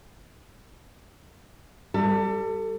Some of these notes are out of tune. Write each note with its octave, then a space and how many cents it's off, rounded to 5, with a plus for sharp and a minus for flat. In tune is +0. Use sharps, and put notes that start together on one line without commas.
G3 +0 A4 +30